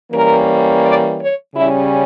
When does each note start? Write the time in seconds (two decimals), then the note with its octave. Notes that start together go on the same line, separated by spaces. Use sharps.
0.11 E3 G3 A#3 C#4 A#4
0.84 D5
1.20 C#5
1.56 C#3 G3 C#4 E4